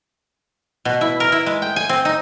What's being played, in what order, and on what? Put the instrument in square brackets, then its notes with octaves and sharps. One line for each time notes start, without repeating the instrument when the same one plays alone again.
[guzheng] B2
E4
A#4
E4
G#3
G5
G#5
C4
D#4